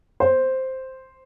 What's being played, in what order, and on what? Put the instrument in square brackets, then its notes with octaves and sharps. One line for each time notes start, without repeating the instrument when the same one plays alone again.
[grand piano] C5